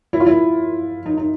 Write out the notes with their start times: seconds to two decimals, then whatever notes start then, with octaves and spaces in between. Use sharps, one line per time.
0.13 E4
0.20 F4
0.27 E4
1.06 D#4
1.17 D#4